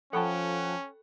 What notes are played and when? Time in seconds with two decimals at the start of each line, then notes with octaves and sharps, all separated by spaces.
0.13 F3 C#4 A4 F#5 G5 A5 B5 C#6